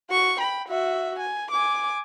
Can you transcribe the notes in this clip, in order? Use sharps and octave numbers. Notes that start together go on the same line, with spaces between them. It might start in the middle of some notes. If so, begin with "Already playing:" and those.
F#4 C#6
G5 B5
F#4 E5
G#5
G#5 D6